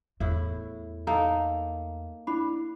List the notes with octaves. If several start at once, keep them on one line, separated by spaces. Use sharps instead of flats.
E2 A2 A3 E4
A#3 D#4 A4 A#5
D4 E4 B5